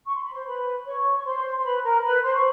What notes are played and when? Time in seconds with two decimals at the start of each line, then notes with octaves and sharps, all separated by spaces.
0.06 C#6
0.15 C6
0.23 B5
0.32 C5 C6
0.45 B4 B5
0.85 C#5 C#6
1.18 C#6
1.25 C5 C6
1.58 C6
1.64 B4 B5
1.83 A#4 A#5
2.03 B4 B5
2.23 C5 C6
2.34 C#6